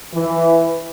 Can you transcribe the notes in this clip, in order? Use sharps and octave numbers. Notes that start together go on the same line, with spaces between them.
E3